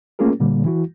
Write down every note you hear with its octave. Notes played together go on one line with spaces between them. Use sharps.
A3 A#3 C#4 F4 G#4 A#4
A#2 D3 G3 A#3
E3 E4 F#4